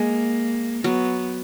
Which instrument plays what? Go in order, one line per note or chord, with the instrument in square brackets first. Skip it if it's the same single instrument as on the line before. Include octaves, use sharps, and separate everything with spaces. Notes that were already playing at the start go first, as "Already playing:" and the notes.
Already playing: [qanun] G#3 [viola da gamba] A#3
[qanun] F#3 [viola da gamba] B3